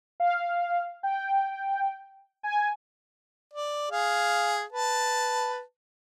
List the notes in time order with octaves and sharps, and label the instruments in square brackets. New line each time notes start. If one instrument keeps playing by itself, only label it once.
[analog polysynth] F5
G5
G#5
[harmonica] D5
G#4 F5
B4 A5